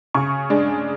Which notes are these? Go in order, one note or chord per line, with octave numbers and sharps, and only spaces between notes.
C#3 C#6
G#3 D4